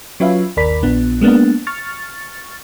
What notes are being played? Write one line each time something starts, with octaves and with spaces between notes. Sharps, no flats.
F#3 C#4 F4 B4 E5 F5
G1 D#2 A#4 D5 B5 B6
A#1 B3 D4
G#3 A#3 B3 D4
C#6 F6 A6